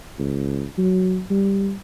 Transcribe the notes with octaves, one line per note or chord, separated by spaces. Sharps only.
C#2
F#3
G3